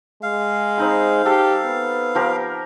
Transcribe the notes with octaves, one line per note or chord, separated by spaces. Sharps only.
G#3 F5
C4 D#4 B5
G4 A4
B3
F3 G4 A#4